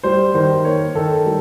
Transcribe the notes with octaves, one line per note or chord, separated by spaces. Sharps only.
G3 C5
D#3 C5
A#3 C#5
D#3 A4
G3